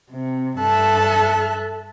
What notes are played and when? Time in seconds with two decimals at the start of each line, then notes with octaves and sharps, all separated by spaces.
0.11 C3
0.59 G2 A4 E5 A5 F#6